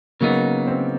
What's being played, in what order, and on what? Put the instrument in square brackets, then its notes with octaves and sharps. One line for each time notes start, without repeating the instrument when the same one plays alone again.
[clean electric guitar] C#3 F#3 B3 D#4 [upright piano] A#3
[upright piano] C4